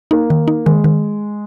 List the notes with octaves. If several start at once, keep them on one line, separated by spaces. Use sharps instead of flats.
A#3 D#4
D#3
D#4
D#3 G#3
D#3